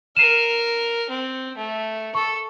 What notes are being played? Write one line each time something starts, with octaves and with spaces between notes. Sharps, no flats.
A#4 F6 C7 D#7 E7
C4
A3
A4 C#6